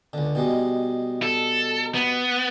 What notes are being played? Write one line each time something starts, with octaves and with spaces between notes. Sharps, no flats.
C#2 D3
B2 G3 G#3
A4
B3